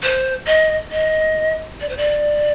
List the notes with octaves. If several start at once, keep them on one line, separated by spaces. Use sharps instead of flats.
C5
D#5
D#5
D5
C5
D5